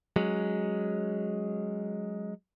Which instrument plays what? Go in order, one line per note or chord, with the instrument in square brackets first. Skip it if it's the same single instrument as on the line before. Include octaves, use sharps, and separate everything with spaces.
[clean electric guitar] F#3 G#3 C#4